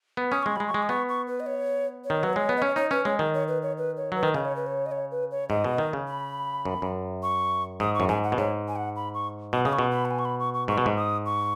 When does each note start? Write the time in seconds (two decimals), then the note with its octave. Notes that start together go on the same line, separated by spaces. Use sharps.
0.17 B3
0.31 C#4 D#6
0.43 G#3 C#6
0.56 G#3 B5
0.68 C#6
0.74 G#3
0.83 D#6
0.89 B3 C#6
1.09 C#6
1.27 B4
1.40 D#5
1.46 C#5
2.04 C#5
2.10 D#3
2.23 F#3 B4
2.33 G#3 C#5
2.49 B3
2.57 D#5
2.62 C#4 C#5
2.76 D#4 C#5
2.91 C#4 B4
3.05 G#3 C#5
3.19 D#3 D#5
3.34 C#5
3.48 B4
3.62 C#5
3.78 B4
3.97 C#5
4.12 F#3 B4
4.23 D#3
4.34 C#3 D#5
4.45 C#5
4.56 B4
4.66 C#5
4.86 D#5
4.92 C#5
5.11 B4
5.31 C#5
5.49 G#2 D#5
5.64 B2
5.78 D#3
5.93 C#3
6.07 B5
6.65 F#2
6.82 F#2
7.23 C#6
7.80 G#2 D#6
7.94 C#6
8.00 F#2
8.08 G#2 G#5
8.24 F#5
8.32 B2
8.38 G#2 C#5
8.68 G#5
8.76 F#5
8.96 B5
9.14 C#6
9.53 B2 D#6
9.65 C#3 D#6
9.73 C#6
9.79 B2
9.91 B5
10.05 F#5
10.11 G#5
10.19 C#6
10.25 B5
10.40 C#6
10.54 C#6
10.68 G#2 C#6
10.78 B2
10.86 G#2
10.97 D#6
11.26 C#6